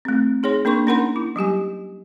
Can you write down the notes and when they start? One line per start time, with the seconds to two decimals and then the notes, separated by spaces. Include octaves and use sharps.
0.05 A3 C4
0.43 D#4 G#4 C#5 C6
0.65 A#3 D4 A#4 C6 C#6
0.87 C#4 D#4 A#4 F#5 B5 C6
1.16 E4
1.36 F#3 G3 G4 G#5